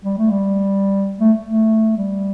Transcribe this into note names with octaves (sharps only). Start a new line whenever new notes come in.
G3
A3
G3
A3
A3
G3